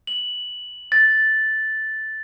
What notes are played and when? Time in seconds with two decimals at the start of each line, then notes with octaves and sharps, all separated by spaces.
0.07 F#7
0.92 A6